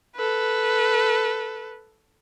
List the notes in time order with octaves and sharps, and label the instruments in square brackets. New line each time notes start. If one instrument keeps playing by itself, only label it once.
[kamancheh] A4 B4